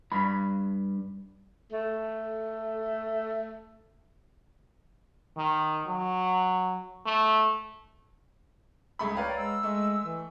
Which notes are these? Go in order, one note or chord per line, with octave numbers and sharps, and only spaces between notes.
G2 B5
A3 A4
D#3
F#3
A3
C#2 A3 G#4 B5
B4 C#5 D5 F5 G5 A#5
G#3 E6
G#3 A3
E3